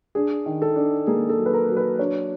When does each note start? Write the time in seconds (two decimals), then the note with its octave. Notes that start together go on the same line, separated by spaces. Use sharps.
0.15 D4 G#4
0.46 D#3
0.62 A4
0.76 D4
1.07 A#3 G#4
1.29 A4
1.37 F#3
1.46 B4
1.54 A#4
1.69 F#3
1.77 B4
1.99 D4 C#5